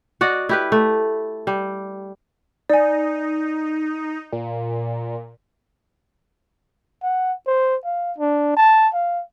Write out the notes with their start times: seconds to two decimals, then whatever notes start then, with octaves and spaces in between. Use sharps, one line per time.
0.21 F#4 D5 D#5 F#5
0.49 E4 G4 B4
0.72 A3
1.47 G3
2.69 D#4 D5 G#5
4.32 A#2
7.03 F#5
7.47 C5
7.85 F5
8.18 D4
8.57 A5
8.94 F5